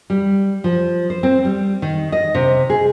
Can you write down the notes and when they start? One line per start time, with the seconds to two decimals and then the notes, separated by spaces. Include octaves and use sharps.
0.10 G3
0.64 F3
1.10 C5
1.23 C4
1.45 G3
1.82 D#3
2.12 D#5
2.35 C3
2.70 G#4